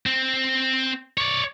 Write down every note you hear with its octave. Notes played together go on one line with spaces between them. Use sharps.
C4
C#5 D5